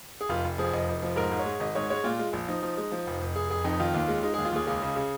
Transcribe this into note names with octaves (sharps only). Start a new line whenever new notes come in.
G#4
F1 F4
F1
F3 G#4
F1 D#5
F1
F3
G#2 A#4
G#2
C#5
G#3
G#1 D#5
G#2 C#5
G#3 C#5
A#2 F4
G#3
A#1
F3 D#4
F3
G#3
F3
F1
F1
F1 G#4
F1 G#4
F2 D#4
D#3 F4
D#2
G#3
G#3 D#4
D#2 G#4
F4
D#2 G#4
C#2 G#4
C#3
C#3